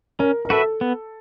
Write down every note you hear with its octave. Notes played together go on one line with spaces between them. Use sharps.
C#4 A#4
A#4
F#4 A4 B4 E5
B3